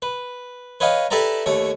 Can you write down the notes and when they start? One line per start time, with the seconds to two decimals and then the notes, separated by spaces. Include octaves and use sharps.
0.02 B4
0.80 B4 C#5 D#5 F5 G5
1.10 E4 G4 A4 B4 D5 A#5
1.46 D#2 A3 C#5